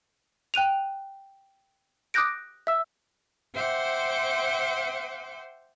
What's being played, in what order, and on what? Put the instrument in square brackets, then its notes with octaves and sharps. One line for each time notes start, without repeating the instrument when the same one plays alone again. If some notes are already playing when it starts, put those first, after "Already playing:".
[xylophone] G5 F#6 D#7 F7
D6 D#6 F#6 G6 A#6 D7
E5 E6
[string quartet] C5 E5 F#5 G5 C6 D6